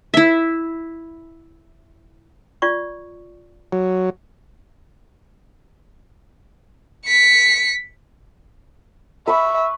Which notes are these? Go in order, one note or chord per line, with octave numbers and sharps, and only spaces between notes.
E4 E5
F4 D5 C#6
F#3
B6 C#7
B4 E5 B5 C#6